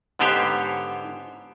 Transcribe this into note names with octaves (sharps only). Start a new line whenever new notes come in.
G#2 D3 B3 G4 C5 C#5